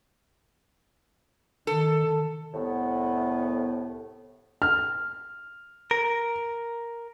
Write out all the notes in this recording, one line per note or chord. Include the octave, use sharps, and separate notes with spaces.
D#3 A4
C2 A2 B3
F6
A#4